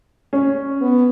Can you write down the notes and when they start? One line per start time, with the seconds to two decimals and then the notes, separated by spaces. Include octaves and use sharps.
0.33 C#4
0.81 B3